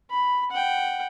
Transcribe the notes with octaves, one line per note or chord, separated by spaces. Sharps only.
B5
F#5 G5